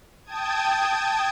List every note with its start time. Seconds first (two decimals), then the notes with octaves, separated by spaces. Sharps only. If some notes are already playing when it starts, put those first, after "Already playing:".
0.24 G5 A5 D#6 G#6